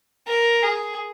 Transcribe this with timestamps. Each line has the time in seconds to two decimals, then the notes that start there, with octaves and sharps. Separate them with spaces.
0.27 A#4
0.63 G#4